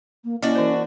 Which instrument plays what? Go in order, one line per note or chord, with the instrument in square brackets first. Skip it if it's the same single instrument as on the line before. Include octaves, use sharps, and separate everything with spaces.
[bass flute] A#3
[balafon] A#3 D#5 [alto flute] C#4 [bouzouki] D4 F#4 [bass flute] E4
[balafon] E3 C5